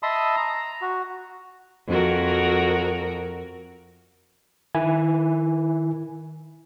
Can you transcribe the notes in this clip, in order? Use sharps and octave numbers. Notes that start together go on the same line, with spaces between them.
D#5 E5 A5 B5 C6 D#6
A#5
F#4
F2 F#4 A#4
D#3 E4 G#5